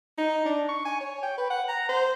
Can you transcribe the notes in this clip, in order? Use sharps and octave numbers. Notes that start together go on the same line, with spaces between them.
D#4
D4
C#6
G#5
C#5
G5
B4
F#5
A#5
C5